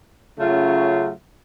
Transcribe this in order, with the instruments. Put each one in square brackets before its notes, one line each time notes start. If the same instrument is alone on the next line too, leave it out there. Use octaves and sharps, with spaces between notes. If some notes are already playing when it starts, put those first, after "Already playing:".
[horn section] C#3 F#3 A3 C#4 F4